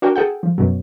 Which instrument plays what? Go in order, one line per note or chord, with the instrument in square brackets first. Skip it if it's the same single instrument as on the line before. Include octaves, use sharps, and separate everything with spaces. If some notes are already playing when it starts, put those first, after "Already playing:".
[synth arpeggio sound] D4 F#4 A#4 G5
G#4 A4 F#5 G5
F3
F#2 B2 F#3